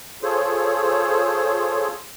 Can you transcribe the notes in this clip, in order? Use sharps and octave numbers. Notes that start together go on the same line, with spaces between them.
F4 G#4 A4 C5 C#5